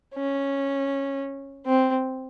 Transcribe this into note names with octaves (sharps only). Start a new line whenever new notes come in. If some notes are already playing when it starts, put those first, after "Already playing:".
C#4
C4